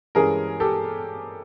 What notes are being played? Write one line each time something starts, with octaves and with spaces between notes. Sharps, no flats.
G2 E3 G#3 C#4 G#4 A#4
G4 A4